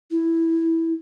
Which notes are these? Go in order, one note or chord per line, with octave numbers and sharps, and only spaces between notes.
E4